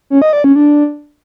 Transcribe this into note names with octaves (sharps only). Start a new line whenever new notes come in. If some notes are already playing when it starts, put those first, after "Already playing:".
C#4
D#5
D5
C#4
D4